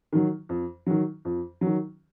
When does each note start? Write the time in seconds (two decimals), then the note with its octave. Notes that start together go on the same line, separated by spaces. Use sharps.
0.13 D#3 F#3
0.49 F2
0.87 D#3 F#3
1.25 F2
1.61 F#3
1.66 D#3